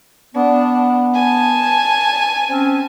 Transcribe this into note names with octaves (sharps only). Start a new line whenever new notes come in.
B3 D4
G#5 A5
C4 C#4